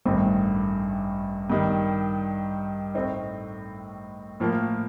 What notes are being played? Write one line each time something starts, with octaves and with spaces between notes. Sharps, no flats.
A1 G2 D#3 A3 C4
G2 D#3 G3
A2 A3 C4 D#4
A2 F3 A#3